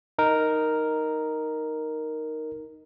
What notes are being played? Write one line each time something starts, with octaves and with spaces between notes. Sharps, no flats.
D#4 A#4